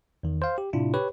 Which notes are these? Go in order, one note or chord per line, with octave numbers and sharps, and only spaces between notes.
E2 D#3
C5 F5
G4
A2 C3 D4 E4 F4
G4 B4 C#5